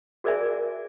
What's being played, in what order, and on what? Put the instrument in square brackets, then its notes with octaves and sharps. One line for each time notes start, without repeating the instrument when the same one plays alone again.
[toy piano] F#4 G#4 A#4 D5 E5 G#5